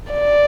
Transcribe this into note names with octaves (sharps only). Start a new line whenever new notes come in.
D5